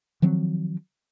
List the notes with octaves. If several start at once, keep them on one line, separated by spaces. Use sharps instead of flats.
D#3 F3 F#3 C4